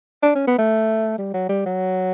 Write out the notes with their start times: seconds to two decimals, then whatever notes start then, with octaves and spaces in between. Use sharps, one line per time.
0.23 D4
0.35 C#4
0.47 B3
0.58 A3
1.18 G3
1.34 F#3
1.49 G3
1.66 F#3